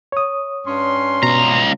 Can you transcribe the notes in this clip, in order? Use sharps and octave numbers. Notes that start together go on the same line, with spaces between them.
C#5 D#6
G2 C#4 C6
C#2 B2 A#5